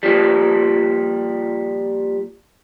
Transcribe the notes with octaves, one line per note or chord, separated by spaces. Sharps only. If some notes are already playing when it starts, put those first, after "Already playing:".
A#2 F3 G3